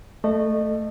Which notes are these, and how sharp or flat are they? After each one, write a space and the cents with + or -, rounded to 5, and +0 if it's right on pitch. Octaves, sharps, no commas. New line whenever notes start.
A3 +0 D#5 -30